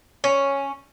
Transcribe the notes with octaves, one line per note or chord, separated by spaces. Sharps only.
C#4